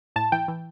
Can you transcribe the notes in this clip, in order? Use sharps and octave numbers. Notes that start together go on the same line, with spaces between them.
A2 A5
E3 G5
E3